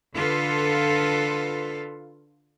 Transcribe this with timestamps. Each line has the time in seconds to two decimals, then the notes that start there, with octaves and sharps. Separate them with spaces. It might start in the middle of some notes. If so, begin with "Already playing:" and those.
0.15 D3 F4 A4 B4